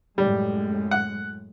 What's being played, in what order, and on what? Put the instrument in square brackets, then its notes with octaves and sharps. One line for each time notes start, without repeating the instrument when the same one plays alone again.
[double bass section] F#2 A2 G#3 [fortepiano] G3
[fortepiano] F#5